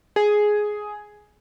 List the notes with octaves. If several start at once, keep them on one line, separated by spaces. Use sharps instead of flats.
G#4